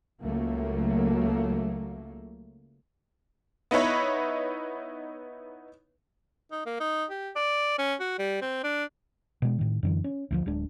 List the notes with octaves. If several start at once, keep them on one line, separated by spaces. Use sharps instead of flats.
C#2 F#3 A3 A#3
B3 D#4 E4 B4 C#5
D#4
A#3
D#4
G4
D5
C#4
F#4
G3
C4
D4
B2 G#3
A2 D#3
F#2 D3 E3
C#4
D2 E3 F3
D1 G#3 D4